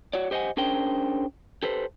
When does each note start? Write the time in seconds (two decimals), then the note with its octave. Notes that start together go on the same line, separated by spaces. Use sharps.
0.13 F#4 C#5 D5
0.31 G4 C5 D#5 F5 F#5 G#5
0.57 C#4 D4 G#4 A#4 C5 G5
1.63 G4 A4 B4 C5